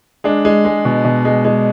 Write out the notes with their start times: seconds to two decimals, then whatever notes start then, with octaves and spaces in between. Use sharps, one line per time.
0.24 G#3 D4
0.45 G#3
0.65 G#3
0.85 B2
1.05 B2
1.25 G#3
1.45 G#3